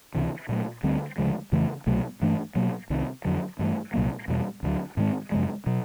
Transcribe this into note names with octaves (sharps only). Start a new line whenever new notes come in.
C#2 C3 E3
A#2 F#3 A3
D2 D3 G3 C4
D2 C#3 F3 G#3
F2 C#3 E3 A3
C2 B2 F#3 A3
G2 E3 A3 D4
B2 F#3 A#3
C2 C3 D#3
F2 D3 F#3
G2 E3 A3
C2 A#2 F#3 A#3
E2 B2 G3
D2 D3 F#3
G#2 D#3 G#3 C4
F#2 C#3 F3 G#3
B2 F#3